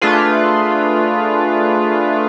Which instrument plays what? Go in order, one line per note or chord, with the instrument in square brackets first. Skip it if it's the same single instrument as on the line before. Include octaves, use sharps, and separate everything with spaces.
[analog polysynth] A3 D4 F4 G#4 B4